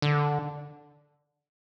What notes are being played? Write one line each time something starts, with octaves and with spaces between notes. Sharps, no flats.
D3